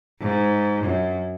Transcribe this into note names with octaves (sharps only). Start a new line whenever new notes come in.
G#2
F#2